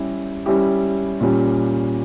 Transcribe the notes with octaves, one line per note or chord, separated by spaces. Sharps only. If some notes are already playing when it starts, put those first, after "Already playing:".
Already playing: G3 C#4 E4 G4
G3 C#4 E4 G4
A#2 G3 C#4 G4